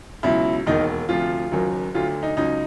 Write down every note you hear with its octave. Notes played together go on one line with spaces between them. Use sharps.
C#2 B2 F#3 E4
E1 D#2 D#3 D#4
D2 C3 F3 F4
F#1 F#2 D#3 F#3
D2 D3 F#3 F4
D#4
C#2 C#3 F#3 D#4